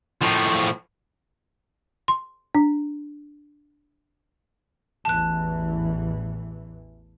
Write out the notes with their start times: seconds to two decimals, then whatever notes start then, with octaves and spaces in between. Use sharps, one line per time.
0.22 A2 F3
2.08 C6
2.55 D4
5.05 A1 E2 E3 A5 F#6